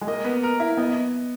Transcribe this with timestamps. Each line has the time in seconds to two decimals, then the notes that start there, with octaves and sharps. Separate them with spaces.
0.01 G#3
0.07 A#3 D#5
0.25 B3
0.43 A#4
0.60 E4
0.77 B3 D#5